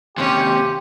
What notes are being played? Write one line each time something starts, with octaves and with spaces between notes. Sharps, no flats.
D#2 C3 C#4 G4 C5 G#5